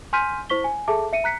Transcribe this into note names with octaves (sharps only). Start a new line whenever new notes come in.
G#5 C6 F6 G6 B6 D#7
E4 C5 C#6 B6 G7
G#5
G#4 A4 E5 A5 D6
E5 C#7 D#7
A#5 F#6 B6 C#7